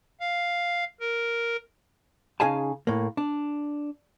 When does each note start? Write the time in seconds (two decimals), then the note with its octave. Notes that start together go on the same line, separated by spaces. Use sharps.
0.20 F5
1.00 A#4
2.40 C#3 D#4 G#4 F5 G#5 A5
2.87 A2 A#3
3.17 D4